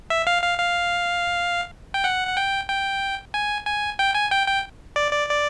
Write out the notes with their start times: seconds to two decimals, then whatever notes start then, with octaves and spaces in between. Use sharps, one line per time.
0.10 E5
0.27 F5
0.42 F5
0.59 F5
1.94 G5
2.04 F#5
2.27 F#5
2.37 G5
2.69 G5
3.34 G#5
3.67 G#5
3.99 G5
4.15 G#5
4.31 G5
4.48 G5
4.96 D5
5.13 D5
5.29 D5